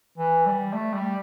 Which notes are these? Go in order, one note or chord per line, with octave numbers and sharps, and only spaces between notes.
E3
G3
A3
G3